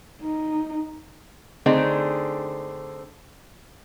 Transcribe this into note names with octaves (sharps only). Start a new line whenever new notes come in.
D#4
D3 A3 C4 D4 D#4 G#4